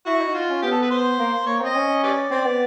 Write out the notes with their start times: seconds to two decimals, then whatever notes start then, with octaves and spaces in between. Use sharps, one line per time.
0.06 E4 F#4
0.21 D#4
0.35 F4
0.49 C#4
0.62 B3 G4
0.72 A4
0.82 B4
0.90 C5
1.19 A#3
1.46 A#3 C#5
1.61 C4 D#5
1.75 C#4
2.03 G4 B4 D5
2.31 C4 D5
2.45 B3